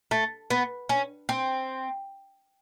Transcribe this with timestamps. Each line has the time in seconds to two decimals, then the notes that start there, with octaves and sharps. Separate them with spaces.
0.11 A3
0.50 B3
0.89 C#4
1.29 C4